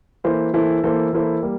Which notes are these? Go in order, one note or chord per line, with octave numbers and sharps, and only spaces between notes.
E3 A#3 E4 A4 C5
E3 A#3 E4 A4 C5
E3 A#3 E4 A4 C5
E3 A#3 E4 A4 C5
G3 A#3